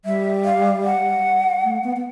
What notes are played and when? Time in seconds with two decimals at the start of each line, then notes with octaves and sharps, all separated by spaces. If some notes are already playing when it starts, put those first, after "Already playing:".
0.05 G3 E5
0.45 F5
0.85 F#5
1.64 A3
1.84 B3
1.96 B3